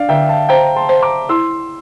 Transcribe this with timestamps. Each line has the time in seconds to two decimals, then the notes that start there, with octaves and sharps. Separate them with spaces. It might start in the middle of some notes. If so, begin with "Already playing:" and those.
Already playing: D4 D5 F5
0.09 D3 E5 G5
0.29 F5 A5
0.49 C5 G5 A#5
0.76 A5 C6
0.89 C5
1.02 A#5 D6
1.29 E4 C6 E6